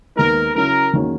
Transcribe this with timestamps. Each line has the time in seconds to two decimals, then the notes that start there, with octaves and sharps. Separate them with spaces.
0.16 D#2 D#3 G#3 B3 D#4 A#4
0.54 C#3 F#3 C#4 E4 A#4
0.93 E2 D#3 F#3 A#3 C#4